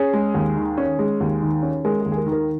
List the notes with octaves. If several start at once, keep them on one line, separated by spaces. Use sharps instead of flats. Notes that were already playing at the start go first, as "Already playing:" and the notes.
Already playing: C#4 G#4
G#3
D#2
D#3
C#4
G#3
D#2
D#3
C#4
G#3 A#4
G#4
D#2
G#4
A#4
D#3
A#4